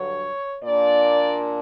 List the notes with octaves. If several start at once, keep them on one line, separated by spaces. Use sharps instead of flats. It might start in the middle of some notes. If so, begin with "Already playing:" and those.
Already playing: G2 D3 F#3 C#5
A#2 A#3 D4 D5